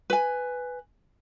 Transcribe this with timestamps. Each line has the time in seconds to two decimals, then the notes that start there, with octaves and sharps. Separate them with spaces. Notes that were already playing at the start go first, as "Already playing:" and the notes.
0.10 B4 G#5